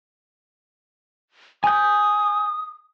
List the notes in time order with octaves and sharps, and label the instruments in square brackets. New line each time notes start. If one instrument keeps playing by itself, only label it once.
[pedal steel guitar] G#5 G6 [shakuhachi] D#6